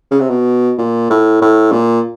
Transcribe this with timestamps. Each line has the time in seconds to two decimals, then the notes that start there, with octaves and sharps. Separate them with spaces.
0.11 C#3
0.21 C3
0.30 B2
0.78 A#2
1.10 A2
1.42 A2
1.72 A#2